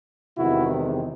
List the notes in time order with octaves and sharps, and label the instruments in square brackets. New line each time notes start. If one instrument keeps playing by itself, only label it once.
[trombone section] E2 C3 D#3 G#3 E4 F#4